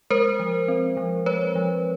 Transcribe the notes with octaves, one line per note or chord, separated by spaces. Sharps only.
G#3 A#4 C5
F3
C4
F3
G#3 B4 C#5
F3